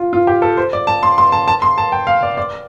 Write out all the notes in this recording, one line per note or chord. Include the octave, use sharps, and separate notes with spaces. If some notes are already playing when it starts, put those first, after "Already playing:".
Already playing: F4
F4
G4
A4
C5
D5
A5
C6
C6
A5
A5
C6
A5
G5
F5
D5
D5